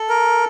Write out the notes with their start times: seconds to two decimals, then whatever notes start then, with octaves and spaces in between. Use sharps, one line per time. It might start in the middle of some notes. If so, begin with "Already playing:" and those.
Already playing: A4
0.09 A#4